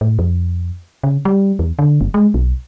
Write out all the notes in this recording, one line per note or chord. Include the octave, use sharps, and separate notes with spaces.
A2
F2
C#3
G3
E2
D3
G1
G#3
B1